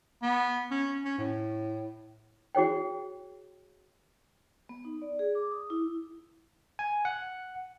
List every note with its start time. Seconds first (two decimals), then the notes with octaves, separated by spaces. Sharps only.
0.23 B3
0.71 C#4
1.05 C#4
1.18 A2
2.55 F#4 G#4 C#5 G5
4.69 B3
4.85 D#4
5.02 D5
5.19 G#4
5.35 D6
5.51 D#6
5.70 E4
6.79 G#5
7.05 F#5